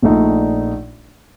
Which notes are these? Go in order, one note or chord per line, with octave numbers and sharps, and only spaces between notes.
A#1 A#2 A3 D#4